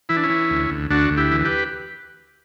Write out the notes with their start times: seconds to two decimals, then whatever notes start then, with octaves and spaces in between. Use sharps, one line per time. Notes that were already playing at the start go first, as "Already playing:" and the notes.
0.09 E3 E4
0.17 D4
0.23 C#4 E4
0.30 E3
0.50 D2
0.70 D2
0.90 D2 D4 F#4
1.11 D2
1.17 E4 G4
1.31 E3
1.45 G4 B4